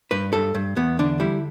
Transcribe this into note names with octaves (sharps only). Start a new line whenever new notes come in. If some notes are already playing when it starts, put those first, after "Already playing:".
G2 B4
G2 A4
G2
E2 B3
D3 D4
G3 E4